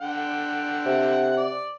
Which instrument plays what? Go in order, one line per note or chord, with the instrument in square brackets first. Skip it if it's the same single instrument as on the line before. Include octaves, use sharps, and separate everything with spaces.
[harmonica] D3 F#5 G5
[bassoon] C3
[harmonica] D5